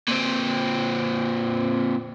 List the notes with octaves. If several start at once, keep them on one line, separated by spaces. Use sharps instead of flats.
A#2 C4